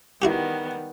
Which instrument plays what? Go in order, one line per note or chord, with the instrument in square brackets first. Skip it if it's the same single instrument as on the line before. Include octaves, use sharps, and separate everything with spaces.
[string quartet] D#3 G3 B3 [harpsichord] E4 F#4 G4